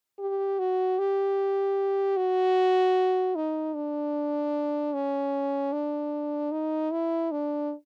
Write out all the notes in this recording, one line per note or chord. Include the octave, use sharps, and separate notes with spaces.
G4
F#4
G4
F#4
D#4
D4
C#4
D4
D#4
E4
D4